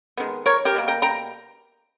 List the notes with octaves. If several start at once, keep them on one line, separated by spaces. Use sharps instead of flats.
D#3 G#3 B3
A#4 C#5
G4 A#4
B2 G3 A#3
G5 A#5
G5 A#5